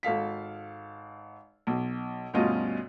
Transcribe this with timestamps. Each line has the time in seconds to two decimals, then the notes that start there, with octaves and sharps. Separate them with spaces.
0.03 G#1 A4 F5 B6
1.67 B1
2.34 D2 G2 B2 C#4 F4 D#5